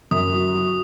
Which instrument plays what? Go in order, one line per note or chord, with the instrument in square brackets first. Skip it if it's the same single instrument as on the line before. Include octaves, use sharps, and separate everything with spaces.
[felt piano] F#2 [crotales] D#6
[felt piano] F#4
F#4